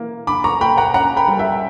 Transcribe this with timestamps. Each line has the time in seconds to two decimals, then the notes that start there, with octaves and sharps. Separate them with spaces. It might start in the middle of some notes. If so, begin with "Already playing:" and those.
Already playing: E3 A#3
0.27 D3 B5 D6
0.44 A#5 C#6
0.60 A#3 G5 B5
0.77 F#5 A#5
0.94 C#4 F#5 A#5
1.17 G5 B5
1.28 G3
1.39 E5 G5